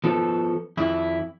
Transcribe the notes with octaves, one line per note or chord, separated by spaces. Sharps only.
F3 B3 A4
F2 E4